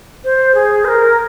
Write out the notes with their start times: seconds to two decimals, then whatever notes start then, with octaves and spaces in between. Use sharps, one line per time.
0.24 C5
0.55 G#4
0.85 C5
0.88 A#4